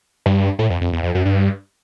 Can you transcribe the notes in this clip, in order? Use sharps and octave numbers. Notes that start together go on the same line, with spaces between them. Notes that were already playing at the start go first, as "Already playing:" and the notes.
G2
A2
F2
F2
E2
F2
F#2
G2